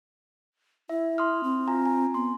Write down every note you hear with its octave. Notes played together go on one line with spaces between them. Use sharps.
E4 E5
C6 D#6 F6
C4
F4 G#5 A#5
G#5
B3 C6